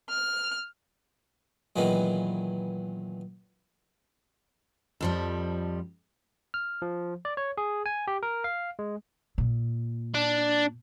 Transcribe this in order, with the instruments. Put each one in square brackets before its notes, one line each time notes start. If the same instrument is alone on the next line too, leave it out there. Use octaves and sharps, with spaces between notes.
[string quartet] F6
[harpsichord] F#2 A#2 D#3 E3 G#3 B3
[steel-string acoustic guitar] F2 F3 G3
[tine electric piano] F6
F3
D5
C#5
G#4
G#5
G4
A#4
F5
G#3
[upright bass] A#2
[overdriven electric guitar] D4